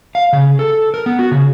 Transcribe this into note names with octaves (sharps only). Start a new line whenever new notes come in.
F5
C#3
A4
A#4
B3
F#4
C#3